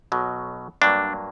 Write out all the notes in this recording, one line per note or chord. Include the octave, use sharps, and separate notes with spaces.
B1 B2 F#3
G2 F#3 A#3 D4